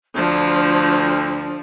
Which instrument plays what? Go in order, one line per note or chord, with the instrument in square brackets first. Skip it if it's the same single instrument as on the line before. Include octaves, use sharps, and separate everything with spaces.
[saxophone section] D2 [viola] F3 [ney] D4